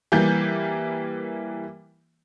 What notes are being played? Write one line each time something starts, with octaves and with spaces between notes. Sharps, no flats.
E3 G3 A#3 G6